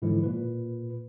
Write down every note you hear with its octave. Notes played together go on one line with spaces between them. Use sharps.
G#2 D3 E3 F3 G#3 E4
A#2 B4